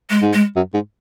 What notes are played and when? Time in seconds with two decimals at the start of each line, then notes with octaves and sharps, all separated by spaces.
0.10 G#3
0.22 G#2
0.33 G#3
0.56 F#2
0.74 G#2